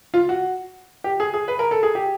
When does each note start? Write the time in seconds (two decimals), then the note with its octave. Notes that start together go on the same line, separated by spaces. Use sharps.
0.14 F4
0.29 F#4
1.04 G4
1.20 G#4
1.34 G#4
1.48 B4
1.59 A#4
1.71 A4
1.83 G#4
1.95 G4